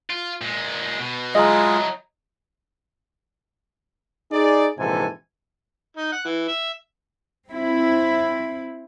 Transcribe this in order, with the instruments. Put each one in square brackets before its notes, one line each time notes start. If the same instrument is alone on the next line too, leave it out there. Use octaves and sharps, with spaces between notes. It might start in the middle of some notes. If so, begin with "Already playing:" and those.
[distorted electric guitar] F4
A#2 G#3
B2
[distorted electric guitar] F#3 E4 [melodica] G#3 F4 G#4 [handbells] D#5 A#5
[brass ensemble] D#4 G#4 D5
A#1 G#2 C3 E3 A4 G#5
[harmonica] D#4
F#5
E3
E5
[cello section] C4 E4